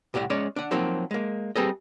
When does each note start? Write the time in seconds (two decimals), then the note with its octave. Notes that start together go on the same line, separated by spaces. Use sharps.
0.14 C2 A2 G4 D5 F#5
0.30 G#3 C#4 C#5 D5
0.56 D4 F#5
0.71 F3 F#3 A#3 C4 D#4
1.11 G#3 A#3
1.56 G3 C4 G#4 A4 B4 D#5